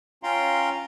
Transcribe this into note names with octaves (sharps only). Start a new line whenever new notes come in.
C#4 F4 F5 G5 A#5 C6